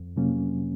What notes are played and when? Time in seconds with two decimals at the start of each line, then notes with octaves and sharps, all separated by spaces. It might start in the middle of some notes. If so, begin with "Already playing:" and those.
Already playing: F2
0.16 C3 F#3 A#3 C#4